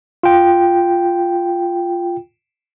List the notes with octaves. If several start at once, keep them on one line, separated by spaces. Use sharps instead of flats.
F4 G5